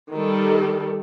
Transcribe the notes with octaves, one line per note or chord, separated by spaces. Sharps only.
D#3 G3 A4